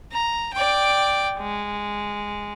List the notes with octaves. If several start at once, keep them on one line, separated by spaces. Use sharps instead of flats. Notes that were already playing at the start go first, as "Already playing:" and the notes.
A#5
D5 G5
G#3